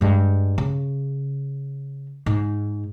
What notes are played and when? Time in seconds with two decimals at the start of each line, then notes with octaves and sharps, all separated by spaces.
0.01 G2 G#3
0.58 C#3
2.26 G#2